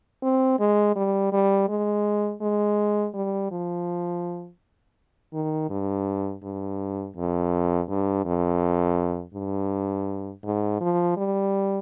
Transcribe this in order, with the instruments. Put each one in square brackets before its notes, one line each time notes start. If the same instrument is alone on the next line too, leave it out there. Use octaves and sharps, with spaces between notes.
[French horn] C4
G#3
G3
G3
G#3
G#3
G3
F3
D#3
G2
G2
F2
G2
F2
G2
G#2
F3
G3